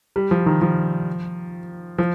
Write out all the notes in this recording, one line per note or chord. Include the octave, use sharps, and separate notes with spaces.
G3
F3
D#3
F3
F3